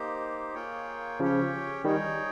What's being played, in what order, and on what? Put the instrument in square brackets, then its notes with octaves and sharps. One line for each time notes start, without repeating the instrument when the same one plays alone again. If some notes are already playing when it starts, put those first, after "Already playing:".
Already playing: [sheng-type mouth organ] A#3 D#4 G4 C5
A#3 F4 G#4 C#5 G5
[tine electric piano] C#3 F3 [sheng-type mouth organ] C#4 G4 C#5 G5
[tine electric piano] D#3 G3 [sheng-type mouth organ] D#4 G#4 C#5 G5